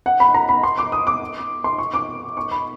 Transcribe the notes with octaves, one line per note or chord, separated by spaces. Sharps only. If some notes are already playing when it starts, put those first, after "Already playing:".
F#5
B5
A#5
B5
C6
D6
D#6
D6
C6
C#6
D6
C#6
B5